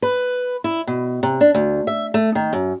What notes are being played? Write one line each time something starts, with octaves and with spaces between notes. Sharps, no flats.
B4
E4
B2
C3
D4
D2
E5
A3
D#3
F#2